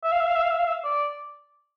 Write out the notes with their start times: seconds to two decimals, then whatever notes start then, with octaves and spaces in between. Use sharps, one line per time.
0.03 E5
0.12 F5
0.20 E5
0.27 F5
0.35 E5
0.43 F5
0.51 E5
0.59 F5
0.67 E5
0.84 D5